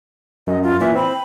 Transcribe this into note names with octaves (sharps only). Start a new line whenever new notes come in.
F#2 D#5
F4
A#2 E3 E5
C4 B5